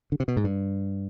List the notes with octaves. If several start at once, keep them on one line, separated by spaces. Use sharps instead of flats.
D3
C3
B2
G#2
G2